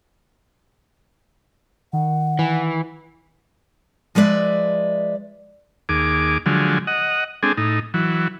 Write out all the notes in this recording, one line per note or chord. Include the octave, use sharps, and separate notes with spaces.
D#3 F#5
E3
F3 G#3 B4 D5 E5
D#2 G#4 D6
D3 F3 F#3 G#3
D#5 F#5
G#3 C4 D4 G#4 A4
A2 D#4
E3 F#3